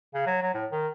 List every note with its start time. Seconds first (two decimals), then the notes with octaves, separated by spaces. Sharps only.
0.14 C#3
0.27 F#3
0.42 F#3
0.54 A2
0.72 D#3